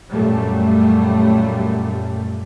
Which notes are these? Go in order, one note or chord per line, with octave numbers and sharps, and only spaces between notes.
F#2 A#2 G3 A3